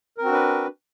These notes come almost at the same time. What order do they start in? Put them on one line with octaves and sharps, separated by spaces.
A#4 C4 F#4 D4 B4